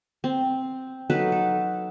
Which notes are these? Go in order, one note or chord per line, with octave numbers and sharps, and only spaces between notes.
C4
F#3 D#4 A4 B4
A4